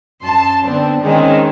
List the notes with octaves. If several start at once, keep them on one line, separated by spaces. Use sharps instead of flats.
F#2 A5 C6
D3 B3 C4 D4
D#3 G#3 C4 C#4